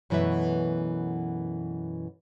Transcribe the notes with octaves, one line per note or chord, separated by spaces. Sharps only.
F#2 B2 E3 A3 B4 E5